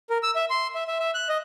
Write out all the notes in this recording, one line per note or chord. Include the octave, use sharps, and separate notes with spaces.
A#4
E6
E5
C6
E5
E5
E5
F#6
D#5